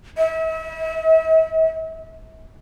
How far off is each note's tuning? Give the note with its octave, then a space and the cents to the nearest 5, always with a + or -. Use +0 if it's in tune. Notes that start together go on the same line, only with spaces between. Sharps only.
E5 -40